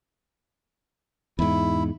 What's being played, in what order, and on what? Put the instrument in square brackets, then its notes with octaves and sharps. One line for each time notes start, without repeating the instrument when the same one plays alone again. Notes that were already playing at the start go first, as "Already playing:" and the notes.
[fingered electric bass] E2 G#2 [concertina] E4